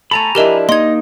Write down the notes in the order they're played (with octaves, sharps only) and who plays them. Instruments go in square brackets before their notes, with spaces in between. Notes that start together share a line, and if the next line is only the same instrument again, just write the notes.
[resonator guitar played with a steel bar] A3 A4 [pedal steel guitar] G#5 A#5 B5
[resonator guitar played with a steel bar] F3 D4 E4 [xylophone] G4 A#4 D#5
[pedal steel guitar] A#3 D#4 [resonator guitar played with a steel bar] D#5 [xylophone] C6 G#6